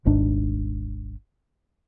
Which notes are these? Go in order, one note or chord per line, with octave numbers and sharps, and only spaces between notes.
D#1 G#1 G#2 D4